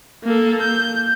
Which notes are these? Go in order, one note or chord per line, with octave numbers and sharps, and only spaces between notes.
A#3 A4
G6